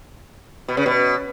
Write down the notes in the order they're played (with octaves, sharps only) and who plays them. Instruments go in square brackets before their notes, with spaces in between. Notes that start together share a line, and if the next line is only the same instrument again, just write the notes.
[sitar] B2
C#3
B2